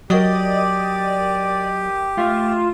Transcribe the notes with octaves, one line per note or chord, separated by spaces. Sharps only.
F#3 G4 A#4 D5 D#5 D#6
A3 F4 E5